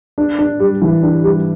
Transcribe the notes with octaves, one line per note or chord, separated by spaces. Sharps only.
D4
D4
G3
E3
D4
G3